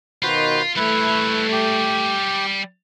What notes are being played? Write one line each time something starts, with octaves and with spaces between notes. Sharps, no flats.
B2 D#3 F4 F#4 C5 B5
G3 A3 E4 B4 C#5
G4